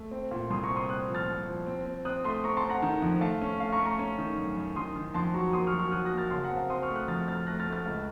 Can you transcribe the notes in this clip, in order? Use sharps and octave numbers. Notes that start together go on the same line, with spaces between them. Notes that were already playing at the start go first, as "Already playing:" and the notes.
Already playing: A3
C4
A#2
C2 C6 D#6
A#5 C#6
C4
C6 D#6
C4 D#6 F#6
F3
F6 A6
C2
F3
C4
C4
C4 D#6 F#6
A3 C6 D#6
C4 A#5 C#6
A5 C6
C4
F#5 A#5
D#3
F2
A3 F5 A5
C#4
A3 F5
A#5 C#6
A3
A#5 C#6
C#4
D#3
F#2
F#2
D#3 C6 D#6
D#3
F2 A5 C6
F#3 A#5 C#6
A#3 C6 D#6
C#6 F6
F#3
C#6 F6
F#3 D#6 F#6
F#6 A#6
A#3
F6 A6
C#3 A5 C6
F#5 A#5
C4
F5 A5
C4 C6 D#6
C#6 F6
A3
D#6 F#6
F2 F6 A6
A3 F6 A6
A3 F#6 A#6
F6 A6
A3
F6 A6
C#2